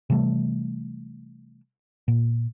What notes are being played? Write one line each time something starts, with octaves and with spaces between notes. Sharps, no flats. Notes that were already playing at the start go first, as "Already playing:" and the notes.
C3 E3 G3 A3
A#2